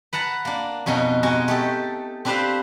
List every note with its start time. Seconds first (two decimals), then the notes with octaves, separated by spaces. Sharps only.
0.13 B4 F#5 A5 A#5
0.45 A#3 D4
0.86 F2 B2 C#4 D#4 F#4 A#5
1.23 G#3 D#4 F#4 D#5 G#5
1.48 A3 G4 A4
2.25 C4 D4 G4 B4 C5 F5